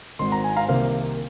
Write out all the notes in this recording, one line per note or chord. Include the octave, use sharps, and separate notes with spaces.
G#1 G#2 D#3 C4 C6
A#5
G#5
F5 A#5
C2 C3 D#3 A#3 C5 F5